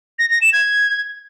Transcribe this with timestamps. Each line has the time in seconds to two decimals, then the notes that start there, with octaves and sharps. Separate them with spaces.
0.19 A#6
0.30 A#6
0.42 E7
0.53 G#6